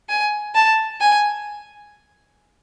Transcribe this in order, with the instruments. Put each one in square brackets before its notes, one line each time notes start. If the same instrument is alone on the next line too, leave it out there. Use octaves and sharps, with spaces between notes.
[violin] G#5
A5
G#5